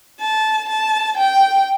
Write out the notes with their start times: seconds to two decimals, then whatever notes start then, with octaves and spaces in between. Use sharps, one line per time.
0.20 A5
0.69 A5
1.18 G5